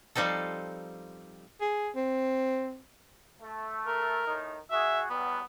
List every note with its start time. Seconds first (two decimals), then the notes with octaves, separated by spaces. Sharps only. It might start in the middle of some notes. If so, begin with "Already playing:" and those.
0.15 F3 G3 C4 D#4 A4
1.61 G#4
1.96 C4
3.42 A3
3.87 A#4
4.26 A2 D#3 D#4
4.71 F#4 G#4 E5
5.10 E2 F#3 G3 B3